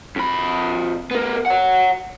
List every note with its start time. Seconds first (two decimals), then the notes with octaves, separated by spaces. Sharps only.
0.16 F2 B5
1.11 B3 A#4
1.46 C#5 F#5